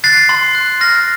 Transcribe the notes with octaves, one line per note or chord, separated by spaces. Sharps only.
F#6 A6 C7
C6
F#6
F6 A#6